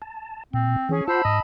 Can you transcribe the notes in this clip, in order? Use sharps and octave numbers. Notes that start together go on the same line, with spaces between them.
A5
A#2 C4
E3 C#4 G#4
F4 C5 F#5 A5 B5 E6
G#2 D#5